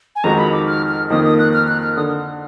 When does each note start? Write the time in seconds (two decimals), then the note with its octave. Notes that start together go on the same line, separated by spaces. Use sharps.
0.16 G#5
0.24 F2 D#3 G#3 D#4 F#4 A#5
0.38 B5
0.52 D6
0.67 F6
0.88 F6
1.10 F2 D#3 A#3 D#4 D#6
1.25 D#6
1.39 F#6
1.53 F6
1.68 F#6
1.82 F6
1.96 D3 D#6